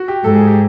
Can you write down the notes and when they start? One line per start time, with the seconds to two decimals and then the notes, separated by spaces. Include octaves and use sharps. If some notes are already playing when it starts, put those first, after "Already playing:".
Already playing: F#4
0.08 G4
0.24 G#2 A4
0.35 G#4
0.47 G4